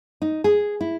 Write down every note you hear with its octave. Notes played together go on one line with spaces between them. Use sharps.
D#4
G#4
E4